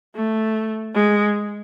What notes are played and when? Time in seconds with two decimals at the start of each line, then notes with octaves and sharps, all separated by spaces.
0.15 A3
0.95 G#3